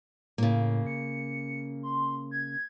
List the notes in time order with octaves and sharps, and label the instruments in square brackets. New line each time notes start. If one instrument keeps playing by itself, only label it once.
[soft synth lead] A2 [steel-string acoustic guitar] C#3 A#3
[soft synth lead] C#7
C6
G#6